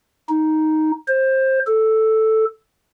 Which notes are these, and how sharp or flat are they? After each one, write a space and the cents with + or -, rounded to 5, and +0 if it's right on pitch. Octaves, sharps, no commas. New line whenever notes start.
D#4 +5
C5 +20
A4 +0